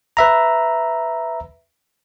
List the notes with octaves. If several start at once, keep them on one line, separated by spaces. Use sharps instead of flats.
B4 E5 A#5